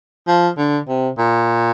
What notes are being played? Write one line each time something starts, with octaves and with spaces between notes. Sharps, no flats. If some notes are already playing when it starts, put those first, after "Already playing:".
F3
D3
C3
A#2